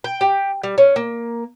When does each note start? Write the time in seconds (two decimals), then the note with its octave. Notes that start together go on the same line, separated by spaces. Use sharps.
0.04 G5
0.21 G4
0.63 G3
0.78 C#4
0.96 A#3